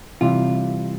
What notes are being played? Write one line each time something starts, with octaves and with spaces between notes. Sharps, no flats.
C3 E3 G3 F4